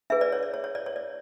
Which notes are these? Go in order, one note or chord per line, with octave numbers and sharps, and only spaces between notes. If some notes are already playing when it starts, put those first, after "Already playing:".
D4 G#4 B4 E5
D5
C#5
D5
C#5
C#5
D5
C#5
D5